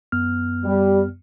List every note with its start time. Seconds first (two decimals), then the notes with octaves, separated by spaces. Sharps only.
0.12 F#2 B3 F6
0.64 G3